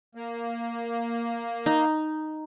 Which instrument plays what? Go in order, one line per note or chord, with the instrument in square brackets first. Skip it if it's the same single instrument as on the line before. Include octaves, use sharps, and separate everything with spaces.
[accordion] A#3
[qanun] D#4